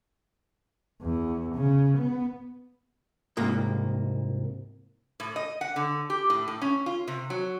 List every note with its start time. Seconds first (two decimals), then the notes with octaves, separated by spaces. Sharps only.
1.02 E2
1.55 C#3
1.98 B3
3.37 C2 G#2 A#3
5.20 A2
5.36 D#5
5.61 F#5
5.76 D3
6.10 G4
6.30 A2
6.48 A2
6.62 C#4
6.86 F4
7.08 C3
7.30 F#3